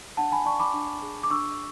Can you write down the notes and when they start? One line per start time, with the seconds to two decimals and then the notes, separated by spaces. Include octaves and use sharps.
0.17 D4 F#5 A5
0.32 G#5 B5
0.45 D5 A5 C#6
0.59 B5 D6
0.74 D4
1.02 G#4
1.23 D6
1.30 D4 C#6 E6